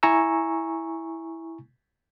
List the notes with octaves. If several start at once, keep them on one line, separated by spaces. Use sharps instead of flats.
E4 G#5 A#5 C#6 E6